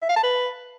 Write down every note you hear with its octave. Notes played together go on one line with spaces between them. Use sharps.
E5
F5
A5
B4